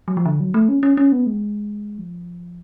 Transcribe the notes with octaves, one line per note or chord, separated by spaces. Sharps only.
F#3
F3
D3
F#3
A3
C#4
C#4
C#4
B3
G#3
F3